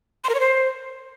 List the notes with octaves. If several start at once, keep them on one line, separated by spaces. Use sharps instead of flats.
C6
A#4
C#5
C5